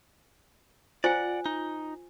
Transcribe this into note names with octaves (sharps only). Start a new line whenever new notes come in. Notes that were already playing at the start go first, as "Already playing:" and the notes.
F4 C5 D5 F#5 G#5
D#4